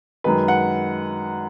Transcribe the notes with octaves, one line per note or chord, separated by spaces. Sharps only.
F#2 D#3 G#3 B4
F#5